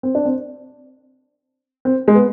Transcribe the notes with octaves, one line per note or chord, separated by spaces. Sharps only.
C4
D4
C4
C4
G#3
B3